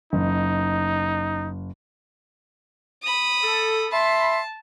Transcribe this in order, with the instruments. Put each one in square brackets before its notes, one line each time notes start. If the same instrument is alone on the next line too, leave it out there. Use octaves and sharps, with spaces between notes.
[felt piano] F#1 [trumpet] D#4
[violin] B5 D#6
[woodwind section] A4
[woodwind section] E5 B5 C6 [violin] A5